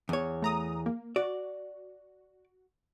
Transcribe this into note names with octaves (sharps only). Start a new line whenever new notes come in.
E2 C#5
A3 A#5 D#6
A#3
F#4 D5